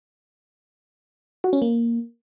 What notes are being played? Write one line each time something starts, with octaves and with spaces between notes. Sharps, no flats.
F#4
C#4
A#3